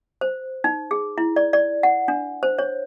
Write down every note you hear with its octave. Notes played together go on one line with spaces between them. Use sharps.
C5
D#4
G#4
E4
D5
D5
F#5
D4
C5
C#5